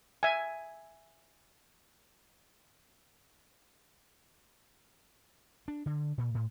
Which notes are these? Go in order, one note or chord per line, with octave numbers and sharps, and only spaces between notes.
E5 G#5
D4
D3
A#2
A2